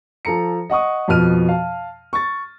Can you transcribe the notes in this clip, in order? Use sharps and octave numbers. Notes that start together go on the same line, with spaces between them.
F3 A4 A#5 C#7
D#5 F#5 C#6 D#6
F2 B2 F3 F6 D#7
F5 A5
C#6 A6